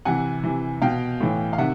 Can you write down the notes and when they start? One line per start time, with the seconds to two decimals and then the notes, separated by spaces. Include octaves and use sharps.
0.05 C3 E3 F#5 G#5
0.44 C3 E3
0.82 B2 F5 G5
1.20 A2 E3
1.53 F5
1.58 C3 D#3 E5 F#5